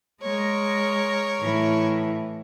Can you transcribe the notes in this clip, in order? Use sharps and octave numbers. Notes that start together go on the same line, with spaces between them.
G#3 A#4 C#5
A2 E3